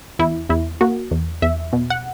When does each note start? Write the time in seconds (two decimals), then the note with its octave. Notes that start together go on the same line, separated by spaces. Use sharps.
0.19 E2 E4
0.49 E2 E4
0.81 A#3 F#4
1.11 E2
1.42 E2 E5
1.73 B2
1.90 F#5